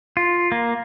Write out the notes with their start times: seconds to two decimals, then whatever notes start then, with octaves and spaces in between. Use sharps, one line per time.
0.17 F4
0.52 A#3